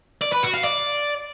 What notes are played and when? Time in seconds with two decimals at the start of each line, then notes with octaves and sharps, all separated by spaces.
0.21 D5
0.32 B4
0.43 F#4
0.53 F5
0.64 D5